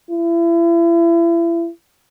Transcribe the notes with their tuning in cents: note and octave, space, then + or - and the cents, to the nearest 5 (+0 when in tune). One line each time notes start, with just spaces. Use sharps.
E4 +35